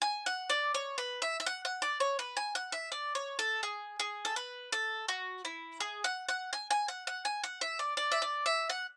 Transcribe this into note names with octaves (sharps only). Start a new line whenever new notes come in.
G#5
F#5
D5
C#5
B4
E5
E5
F#5
F#5
D5
C#5
B4
G#5
F#5
E5
D5
C#5
A4
G#4
G#4
A4
B4
A4
F#4
E4
G#4
F#5
F#5
G#5
G#5
F#5
F#5
G#5
F#5
E5
D5
D5
E5
D5
E5
F#5